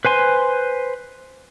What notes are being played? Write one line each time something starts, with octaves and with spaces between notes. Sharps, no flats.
B4 C5 G#5 C6